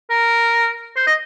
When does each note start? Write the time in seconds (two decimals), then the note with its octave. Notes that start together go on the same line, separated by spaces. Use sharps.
0.10 A#4
0.96 C5
1.07 D#5